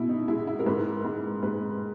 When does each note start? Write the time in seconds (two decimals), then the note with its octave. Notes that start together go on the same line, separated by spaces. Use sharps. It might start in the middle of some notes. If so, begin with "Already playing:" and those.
Already playing: B2 E4
0.09 D#4
0.28 G#3 E4
0.47 E4
0.59 A#4
0.66 G#2 B4
1.05 G#2
1.43 G#2 B4